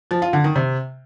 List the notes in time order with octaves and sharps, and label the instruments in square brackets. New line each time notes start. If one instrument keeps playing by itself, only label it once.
[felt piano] F3
F4
D3
D#3
C3